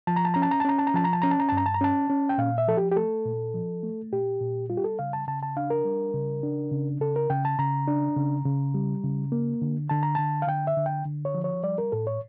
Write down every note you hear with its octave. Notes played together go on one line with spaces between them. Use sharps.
F3 A5
A#5
A5
C#4 A#5
A5
A#5
A5
C#4 A#5
A5
A#5
F3 A5
A#5
A5
C#4 A#5
A5
A#5
G2 A5
A#5
A5
A#5
C#4 A5
C#4
G5
A#2 F5
E5
F3 A4
G4
G4
A3 A4
A#2
F3
A3
A#2 G4
A#2
G3 F4
G4
A4
C#3 F5
A5
C#3 A5
A5
D4 F5
A#4
G3
C#3
D4
C#3
C#3 A4
A#4
C#3 G5
A5
C#3 A#5
D4
C#3
C#3
G3
C#3
A#3
D3
D3 A5
A#5
D3 A5
F5
D3 G5
E5
D3
G5
D3
C#5
F3
C#5
G3 D5
A#4
A2 A4
C#5